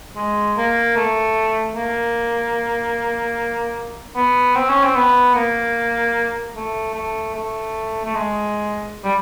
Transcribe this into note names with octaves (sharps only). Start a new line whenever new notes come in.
G#3
A#3
A3
A#3
B3
C4
C#4
C4
B3
A#3
A3
A3
A3
A3
G#3
G3